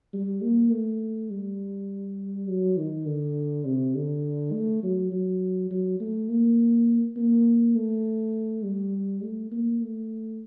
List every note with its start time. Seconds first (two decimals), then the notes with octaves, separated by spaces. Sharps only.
0.13 G3
0.42 A#3
0.72 A3
1.30 G3
2.48 F#3
2.77 D#3
3.06 D3
3.65 C3
3.95 D3
4.53 A3
4.83 F#3
5.12 F#3
5.71 F#3
6.00 A3
6.29 A#3
7.17 A#3
7.76 A3
8.64 G3
9.23 A3
9.51 A#3
9.81 A3